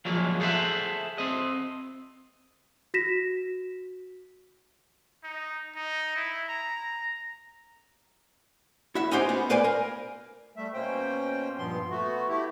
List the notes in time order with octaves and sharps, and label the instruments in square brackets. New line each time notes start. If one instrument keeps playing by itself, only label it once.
[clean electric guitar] F3 F#3 G#3 A#3
G#4 A4 C5 D#5 E5 F#5
C4 D#5
[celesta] F#4 A#6 B6 E7
[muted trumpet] D#4
D#4
E4
A#5
[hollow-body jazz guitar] E4 F#4 E5
C#4 D#4 F#4 G4 C5
B3
B4 C5 D5 F5 G#5
A#4
[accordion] G3 A3 E5
B2 A#3 C#4 C5 G5
G2 A#2 F3 B3 C6
A3 B3 F#4
A3 E4 G4